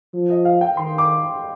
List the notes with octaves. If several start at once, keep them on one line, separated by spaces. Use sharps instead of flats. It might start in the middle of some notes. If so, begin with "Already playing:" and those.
F3
D#5
F5
G5
D#3 C6
D6